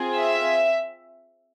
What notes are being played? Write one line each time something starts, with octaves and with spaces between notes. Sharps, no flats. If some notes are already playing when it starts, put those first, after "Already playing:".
Already playing: C4 F4 G#4
E5